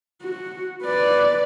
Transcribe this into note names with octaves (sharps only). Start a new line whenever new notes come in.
F#4
B4 D5